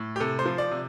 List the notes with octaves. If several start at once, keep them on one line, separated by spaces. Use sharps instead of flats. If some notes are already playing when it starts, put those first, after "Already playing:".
Already playing: A2
G4
C3 A4
C5
F3
D5
C3